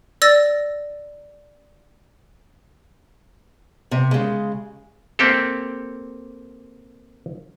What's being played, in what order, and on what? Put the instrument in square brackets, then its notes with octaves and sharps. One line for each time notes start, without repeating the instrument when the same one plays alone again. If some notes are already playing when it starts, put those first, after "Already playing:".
[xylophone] D5 E6 A6 A#6
[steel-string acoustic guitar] C3
C#3 G#3
[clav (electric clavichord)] A#3 C4 G4 A4